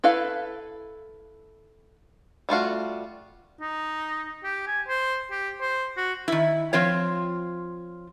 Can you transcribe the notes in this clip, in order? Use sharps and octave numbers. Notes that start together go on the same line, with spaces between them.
E4 A4 B4 F5
G3 A3 F4 F#4
D#4
G4
G#5
C5
G4
C5
F#4
D#3 E4
F3 C4 F4 C#5